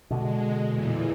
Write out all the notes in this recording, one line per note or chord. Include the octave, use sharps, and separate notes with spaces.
B2 D3 G#3
E2 A#2 E3